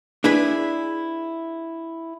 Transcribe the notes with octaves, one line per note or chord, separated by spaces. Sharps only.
D4 E4 G#4 B4